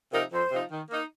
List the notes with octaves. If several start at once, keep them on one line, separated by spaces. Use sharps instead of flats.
C3 F3 D#4 A#4
F2 C5
C3 F3 D#4
D#3
A#3 D#4